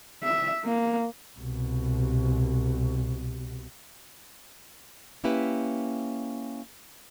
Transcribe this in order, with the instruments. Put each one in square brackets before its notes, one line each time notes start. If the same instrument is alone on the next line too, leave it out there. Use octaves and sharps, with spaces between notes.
[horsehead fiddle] E5
A#3
[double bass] C2 B2
[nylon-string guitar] A#3 C#4 E4 G4 B4